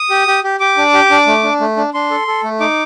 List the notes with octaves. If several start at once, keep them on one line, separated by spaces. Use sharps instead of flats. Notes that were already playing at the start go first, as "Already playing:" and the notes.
Already playing: D#6
G4
G4
G4
G4 D6
D4
G4
D4
A3
D4
A3
D4
D4 C6
A4
A4
A3
D#4 D6